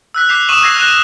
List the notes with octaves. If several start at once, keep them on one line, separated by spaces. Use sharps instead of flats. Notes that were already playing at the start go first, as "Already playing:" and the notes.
E6 F#6 B6
D6 G6 B6 C7 F7
C#6 D#6 D#7 E7 F#7
C#6 E6 G#6 A#6 C7
F6 F#6 A#6 D#7 F7